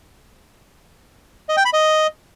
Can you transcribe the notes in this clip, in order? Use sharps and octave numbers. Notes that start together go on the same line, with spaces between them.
D#5
G5
B5
D#5